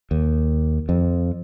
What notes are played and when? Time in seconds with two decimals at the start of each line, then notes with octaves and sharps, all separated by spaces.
0.11 D#2
0.89 F2